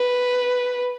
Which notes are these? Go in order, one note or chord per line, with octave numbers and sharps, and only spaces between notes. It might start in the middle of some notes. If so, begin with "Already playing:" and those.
Already playing: B4